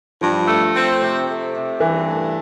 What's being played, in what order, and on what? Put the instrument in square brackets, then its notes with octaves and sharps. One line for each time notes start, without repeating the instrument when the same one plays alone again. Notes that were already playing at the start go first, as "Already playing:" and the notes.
[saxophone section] G2 [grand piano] F3
[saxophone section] A3
C4
C3
A3
C3
[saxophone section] G2 [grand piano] E3
[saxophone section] A3